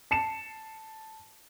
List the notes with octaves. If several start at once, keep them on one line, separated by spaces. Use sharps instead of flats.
A5 C7 C#7 E7